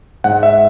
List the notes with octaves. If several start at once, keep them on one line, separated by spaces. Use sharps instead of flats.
G#2 F#5
E5